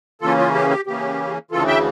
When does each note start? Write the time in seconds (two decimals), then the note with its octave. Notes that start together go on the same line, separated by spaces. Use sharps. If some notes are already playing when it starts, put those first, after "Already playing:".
0.21 C#3 E3 A#3 C#4 F4 A4
0.38 F4
0.54 G4
0.70 G4
0.87 C#3 E3 A#3 C#4 G4
1.51 D2 C#3 E3 F4 A4
1.67 E5 G5